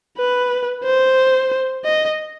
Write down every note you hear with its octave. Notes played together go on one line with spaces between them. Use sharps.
B4
C5
D#5